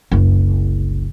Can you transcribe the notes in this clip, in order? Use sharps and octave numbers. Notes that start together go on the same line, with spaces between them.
F#1 C2